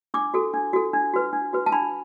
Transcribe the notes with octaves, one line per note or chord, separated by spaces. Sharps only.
D4 D6
F#4 A4
D4
F#4 A4
D4
F#4 B4
D4
F#4 B4
A5
D4 B5